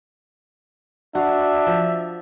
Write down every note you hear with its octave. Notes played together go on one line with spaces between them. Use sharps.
D4 F#4 E5 F5
F3